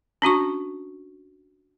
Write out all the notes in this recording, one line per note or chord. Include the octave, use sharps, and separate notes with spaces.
C#4 D4 F#4 C#6